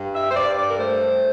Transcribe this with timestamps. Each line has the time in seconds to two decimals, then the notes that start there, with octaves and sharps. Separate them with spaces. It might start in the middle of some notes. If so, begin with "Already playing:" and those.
Already playing: G2
0.13 E5
0.30 C5
0.35 G2 D5
0.56 D5
0.67 A#4
0.77 A3 C5